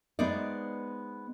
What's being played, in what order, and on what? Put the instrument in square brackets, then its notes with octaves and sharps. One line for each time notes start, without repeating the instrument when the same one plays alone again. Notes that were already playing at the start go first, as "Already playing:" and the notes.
[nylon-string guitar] G#3 B3 D#4 C5 D5